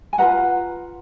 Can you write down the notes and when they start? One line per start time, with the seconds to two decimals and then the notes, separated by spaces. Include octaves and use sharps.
0.13 G#5
0.18 F4 G#4 B4 F#5 A#5